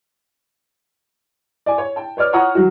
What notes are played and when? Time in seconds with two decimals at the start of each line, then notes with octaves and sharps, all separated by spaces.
1.66 D5 G#5
1.78 C#5
1.96 G5 A5
2.17 B4 C#5 D5 F6
2.33 F4 C#5 F#5 A#5 C#6 D#6
2.55 D#3 F#3 F#4